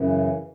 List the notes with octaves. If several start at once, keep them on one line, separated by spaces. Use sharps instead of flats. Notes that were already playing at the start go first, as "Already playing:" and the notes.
Already playing: F#2 C#3 E3